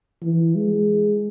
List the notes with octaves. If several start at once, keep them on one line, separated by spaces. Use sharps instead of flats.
E3
G#3